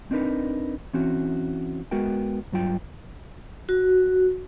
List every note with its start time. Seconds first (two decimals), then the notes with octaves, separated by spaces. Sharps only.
0.11 C4 D4 D#4 A#4 B4
0.94 E3 C4 C#4 F#4
1.91 G#3 B3 F#4 A#4 G5
2.52 G2 F#3 F4 G5
3.69 F#4